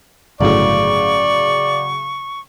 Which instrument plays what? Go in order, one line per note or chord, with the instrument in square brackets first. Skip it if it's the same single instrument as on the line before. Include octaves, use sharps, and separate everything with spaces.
[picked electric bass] G1 A2 [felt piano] C#3 F#3 [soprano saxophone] D5 [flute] C#6